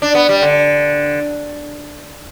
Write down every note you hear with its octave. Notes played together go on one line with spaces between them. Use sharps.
D4
B3
G3
D3